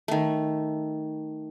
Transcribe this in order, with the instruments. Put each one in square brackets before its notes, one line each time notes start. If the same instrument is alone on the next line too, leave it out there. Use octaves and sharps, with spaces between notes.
[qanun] D#3 A3